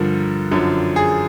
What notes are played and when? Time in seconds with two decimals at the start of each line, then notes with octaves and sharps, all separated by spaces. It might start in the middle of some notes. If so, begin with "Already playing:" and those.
Already playing: G2 D3 F3 A#4
0.51 F#2 D3 F3
0.96 G#4